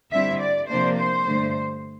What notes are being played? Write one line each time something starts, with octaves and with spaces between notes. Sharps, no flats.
D3 G3 C4 E4 E5
D5
C3 F3 A#3 D4 C5
C5
G2 D3 A3